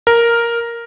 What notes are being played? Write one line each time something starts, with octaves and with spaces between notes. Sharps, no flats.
A#4